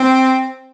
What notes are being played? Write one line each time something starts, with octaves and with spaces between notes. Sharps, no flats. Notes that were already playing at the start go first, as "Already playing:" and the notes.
Already playing: C4